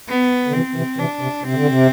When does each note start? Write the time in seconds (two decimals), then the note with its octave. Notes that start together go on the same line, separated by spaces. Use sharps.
0.09 B3
0.48 D3
0.53 C3 E3 C4
0.75 C3 E3
0.98 C3 E3 D4
1.21 C3
1.43 C3 C4
1.55 D3
1.67 C3